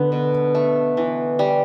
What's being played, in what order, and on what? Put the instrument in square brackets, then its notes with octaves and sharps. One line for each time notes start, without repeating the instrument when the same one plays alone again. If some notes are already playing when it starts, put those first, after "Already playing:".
Already playing: [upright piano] D3 [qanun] B3
[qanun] B2
A3
E3
G3